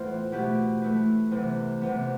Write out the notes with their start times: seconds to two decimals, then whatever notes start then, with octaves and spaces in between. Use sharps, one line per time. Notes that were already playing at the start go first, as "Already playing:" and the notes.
Already playing: A2 E3 B3 F4 C5
0.32 B2 A3 E4 G4 B4
0.82 A3 E4 B4
1.31 C3 E3 B3
1.82 C3 E3 B3